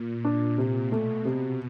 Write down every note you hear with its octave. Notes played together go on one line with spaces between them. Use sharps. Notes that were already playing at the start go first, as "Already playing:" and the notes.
Already playing: A#2
D4
C3
B2 A3
C3